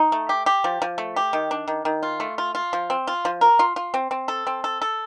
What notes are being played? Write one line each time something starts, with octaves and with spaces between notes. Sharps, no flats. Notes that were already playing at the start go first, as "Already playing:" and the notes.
Already playing: D#4
A3
G4
G4
F3
F3
A3
G4
D#3
D4
D#3
D#3
F4
A3
F4
F4
F3
C4
F4
F3
A#4
F4
F4
C4
C4
A4
C4
A4
A4